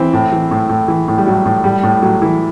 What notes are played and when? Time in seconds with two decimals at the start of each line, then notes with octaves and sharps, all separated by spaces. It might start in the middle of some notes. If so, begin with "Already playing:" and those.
Already playing: E3 C4
0.13 A2
0.32 E3
0.51 A2
0.69 A2
0.88 E3
1.08 A2
1.18 G3
1.26 A2 F#3
1.46 A2
1.64 A2 G3
1.83 A2
2.02 A2 F#3
2.22 E3